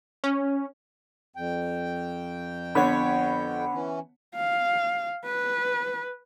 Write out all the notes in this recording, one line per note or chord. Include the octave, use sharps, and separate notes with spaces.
C#4
F2 G5
D3 B3 C#5 F#5 B5
E3 C#4
F5
B4